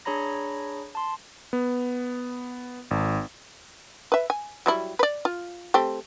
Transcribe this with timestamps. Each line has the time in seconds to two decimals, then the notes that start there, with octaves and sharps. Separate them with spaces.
0.05 D4 G#4 C#5 A#5 B5 A#6
0.95 A5 C6
1.53 B3
2.91 G#1
4.12 B4 E5
4.30 G#5
4.66 F#3 G3 E4
4.99 B4 D5
5.25 F4
5.74 A3 C4 G4